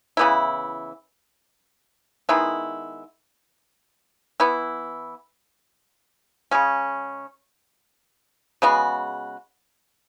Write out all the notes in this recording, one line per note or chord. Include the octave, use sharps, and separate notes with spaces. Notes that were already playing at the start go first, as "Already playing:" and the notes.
C#3 E3 B3 E4
D#3 G#3 B3 E4
E3 B3 E4
C#3 G#3 C#4
C#3 G#3 B3 F#4